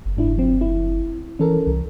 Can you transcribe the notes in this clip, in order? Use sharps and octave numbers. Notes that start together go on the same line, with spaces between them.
F#1
G#2 D4 E4
F3 C4
E4
E3 C#4 A4 A#4
C2